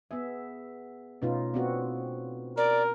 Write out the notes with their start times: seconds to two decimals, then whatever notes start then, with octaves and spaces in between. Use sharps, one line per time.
0.11 B3 G#4 E5
1.22 B2 A3 C#4 D#4 F4
1.54 B3 C4 F#4 D5
2.57 A#4 D5